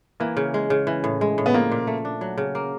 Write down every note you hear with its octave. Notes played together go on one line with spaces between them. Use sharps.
E3 A#3
C#3
G#3
C#3
E3
A2
G#3
A2
B3
F3 A#3
A#2
A3
D4
F#3
C#3
A#3